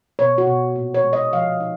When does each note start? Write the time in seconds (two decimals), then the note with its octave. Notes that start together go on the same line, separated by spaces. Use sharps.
0.19 B2 C#5
0.38 F#4
0.47 B2
0.76 A#2
0.94 C#5
1.04 G#3
1.13 D#5
1.33 F3 F5
1.60 D#4